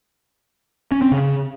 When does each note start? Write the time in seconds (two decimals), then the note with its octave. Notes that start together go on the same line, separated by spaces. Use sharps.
0.92 C#4
1.02 C4
1.12 C#3